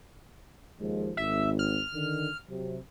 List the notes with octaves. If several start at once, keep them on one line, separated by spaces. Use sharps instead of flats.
D#2 F3 G#3
G#1 E5
F6
D3 D#3
C3 F#3